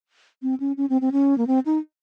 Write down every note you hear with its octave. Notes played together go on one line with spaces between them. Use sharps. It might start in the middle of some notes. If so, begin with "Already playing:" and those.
C4
C#4
C#4
C4
C4
C#4
A#3
C4
D#4